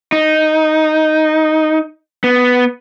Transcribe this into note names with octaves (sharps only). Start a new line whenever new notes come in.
D#4
B3